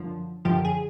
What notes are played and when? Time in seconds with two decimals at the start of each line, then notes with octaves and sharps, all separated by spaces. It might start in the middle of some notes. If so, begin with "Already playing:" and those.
Already playing: F#2 D3 F3
0.45 F#2 D3 F3 G4
0.65 G#4